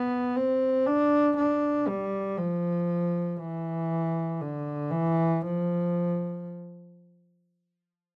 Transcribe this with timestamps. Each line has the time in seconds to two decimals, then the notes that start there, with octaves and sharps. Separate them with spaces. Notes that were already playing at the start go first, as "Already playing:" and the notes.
Already playing: B3
0.36 C4
0.87 D4
1.37 D4
1.88 G3
2.38 F3
3.39 E3
4.41 D3
4.91 E3
5.42 F3